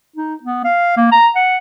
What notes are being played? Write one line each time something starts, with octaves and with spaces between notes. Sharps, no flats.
D#4
B3
F5
A#3
A#5
F#5